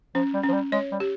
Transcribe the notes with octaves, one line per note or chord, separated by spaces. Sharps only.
F3 C#4
G3
F3 C#4
G3
G#3 C#5
G3
G4